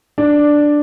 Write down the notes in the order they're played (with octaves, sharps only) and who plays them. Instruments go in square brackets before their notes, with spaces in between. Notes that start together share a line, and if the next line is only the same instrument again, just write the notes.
[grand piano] D4